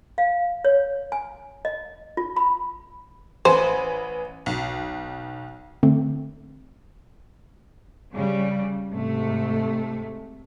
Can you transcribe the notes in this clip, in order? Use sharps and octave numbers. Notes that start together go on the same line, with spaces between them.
F5
C#5
G#5
D#5
F4
B5
A1 B4 C5 G#5
B1
D3 A3 C4
C#3 G3
G#2 C3 A3